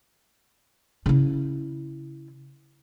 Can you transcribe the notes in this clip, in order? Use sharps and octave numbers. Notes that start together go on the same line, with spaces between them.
C#3 E4